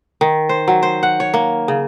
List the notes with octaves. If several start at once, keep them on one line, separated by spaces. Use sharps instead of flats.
D#3
C5
F#3
C5
F#5
C#5
A#3
C#3